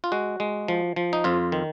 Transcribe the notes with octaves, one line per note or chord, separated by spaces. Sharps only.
F4
G#3 F#4
G#3
F3
F3
D#4
F2 F4
D#3